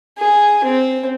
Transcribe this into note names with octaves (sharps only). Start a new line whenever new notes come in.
G#4
C4